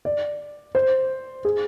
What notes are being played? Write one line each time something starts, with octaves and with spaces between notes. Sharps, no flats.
D5
C5
G#4